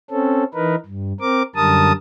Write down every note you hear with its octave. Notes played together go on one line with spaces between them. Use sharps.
C4 C#4 A4
E3 D#4 A#4 B4
G2
C4 A#4 D6
F#2 D3 G3 A#4 A5 D#6